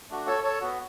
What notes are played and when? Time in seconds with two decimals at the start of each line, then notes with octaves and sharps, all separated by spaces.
0.10 A3 D4 F#4
0.27 A4 C#5
0.44 A4 C#5
0.61 B3 F#4